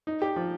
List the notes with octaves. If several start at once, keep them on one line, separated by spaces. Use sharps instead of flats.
D#4
G4
F3